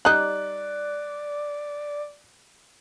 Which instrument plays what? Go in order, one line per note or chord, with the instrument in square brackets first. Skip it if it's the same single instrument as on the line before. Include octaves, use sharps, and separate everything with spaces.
[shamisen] G3 D#4 [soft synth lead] D5 [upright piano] F#6